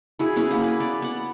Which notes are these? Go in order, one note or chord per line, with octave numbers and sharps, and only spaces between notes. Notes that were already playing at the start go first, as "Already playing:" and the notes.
E4 F#4 G#4
B3 C#4 E4 G#4
A#3 G#4
B4
B3 D5
B3 F#5